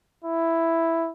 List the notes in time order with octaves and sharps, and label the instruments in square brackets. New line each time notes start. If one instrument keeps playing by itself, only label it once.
[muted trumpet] E4